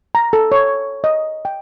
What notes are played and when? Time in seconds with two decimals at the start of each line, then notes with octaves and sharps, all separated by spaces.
0.15 A#5
0.33 A4
0.52 C#5
1.04 D#5
1.45 G5